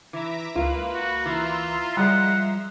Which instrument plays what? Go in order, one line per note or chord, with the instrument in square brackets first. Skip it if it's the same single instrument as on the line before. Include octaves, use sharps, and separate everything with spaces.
[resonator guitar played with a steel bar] E3 [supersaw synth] E5 A#5 D6
[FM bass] C#2 [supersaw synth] A#3 B4 [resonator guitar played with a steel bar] F4
[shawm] F#4
[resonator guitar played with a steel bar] E3 [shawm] F4 [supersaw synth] E5 A#5 C6
[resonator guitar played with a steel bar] F3 G#3 [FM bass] G3 [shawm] F#5